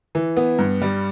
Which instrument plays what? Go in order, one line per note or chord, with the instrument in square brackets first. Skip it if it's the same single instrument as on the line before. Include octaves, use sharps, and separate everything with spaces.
[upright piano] E3
B3
G2
G3